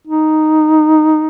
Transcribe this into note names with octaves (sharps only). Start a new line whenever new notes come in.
D#4